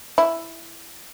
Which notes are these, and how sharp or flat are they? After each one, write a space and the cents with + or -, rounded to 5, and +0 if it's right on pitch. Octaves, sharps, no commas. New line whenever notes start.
E4 +5